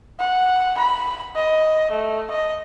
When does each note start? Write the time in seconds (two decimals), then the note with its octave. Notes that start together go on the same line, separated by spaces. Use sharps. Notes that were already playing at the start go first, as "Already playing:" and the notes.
0.19 F#5
0.77 B5
1.35 D#5
1.91 A3
2.30 D#5